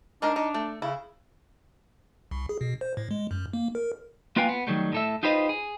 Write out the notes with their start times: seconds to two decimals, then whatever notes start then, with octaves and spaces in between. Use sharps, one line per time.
0.22 G#3 D4 D#4 A#4
0.36 D#4
0.54 A3
0.82 C#3 E4
2.31 C2
2.49 G#4
2.61 B2
2.81 C5
2.97 A2
3.11 G#3
3.31 F#2
3.53 A#3
3.75 A#4
4.36 A#3 F4 B4 F5 G5 G#5
4.49 B3
4.67 D#3 F#3 G3 A3
4.93 A2 A4 E5
5.23 D#4 F4 G4 B4 C5 D#5
5.49 G#4